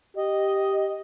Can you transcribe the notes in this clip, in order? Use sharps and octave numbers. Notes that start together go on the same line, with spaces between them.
G4 D#5